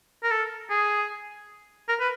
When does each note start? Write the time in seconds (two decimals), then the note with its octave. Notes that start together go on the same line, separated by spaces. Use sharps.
0.23 A#4
0.31 A4
0.70 G#4
1.89 A#4
2.00 B4